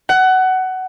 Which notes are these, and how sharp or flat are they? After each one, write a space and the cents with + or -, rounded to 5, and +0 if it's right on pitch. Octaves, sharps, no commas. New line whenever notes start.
F#5 +20